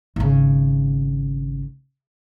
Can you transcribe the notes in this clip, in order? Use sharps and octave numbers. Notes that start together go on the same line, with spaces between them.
G#1 C#3